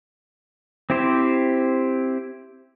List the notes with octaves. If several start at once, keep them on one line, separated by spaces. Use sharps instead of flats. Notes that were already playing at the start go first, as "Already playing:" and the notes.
C4 E4 G4 C5